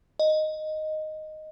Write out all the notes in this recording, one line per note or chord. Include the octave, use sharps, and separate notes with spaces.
D#5